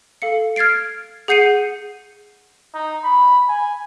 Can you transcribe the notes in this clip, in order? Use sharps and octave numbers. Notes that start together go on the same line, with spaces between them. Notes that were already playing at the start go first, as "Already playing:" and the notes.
A4 F5 C#7
F6 G#6 A6 C7 D7
G#4 F#5 G6 C7 C#7 D#7
D#4
B5
G#5